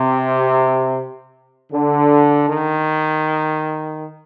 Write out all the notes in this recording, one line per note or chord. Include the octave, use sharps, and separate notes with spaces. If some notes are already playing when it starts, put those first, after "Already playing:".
Already playing: C3
D3
D#3